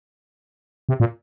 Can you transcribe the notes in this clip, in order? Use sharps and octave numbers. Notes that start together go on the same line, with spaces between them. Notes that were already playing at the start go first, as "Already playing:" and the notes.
C3
A#2